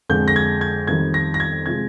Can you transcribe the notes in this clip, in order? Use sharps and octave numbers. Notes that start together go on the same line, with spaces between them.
F2 D3 G#3 G6
A#6
G#6
G#6
F2 D#3 G3 G#6
A#6
A#6
G#6
C3 F3 G#3 G#6